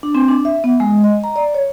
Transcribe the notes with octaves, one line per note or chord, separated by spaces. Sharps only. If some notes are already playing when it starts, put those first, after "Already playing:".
D4
C4
D4
E5
B3
G#3
D#5
A#5
D5
C#5